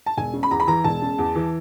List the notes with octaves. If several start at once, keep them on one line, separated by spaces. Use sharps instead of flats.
A5
E1 G#5
C#3
B5
E2 A#5
B5
E3 A#5
E1 A5
C#3
E2
E3